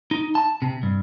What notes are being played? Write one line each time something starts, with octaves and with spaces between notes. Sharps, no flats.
D#4
A5
C3
G2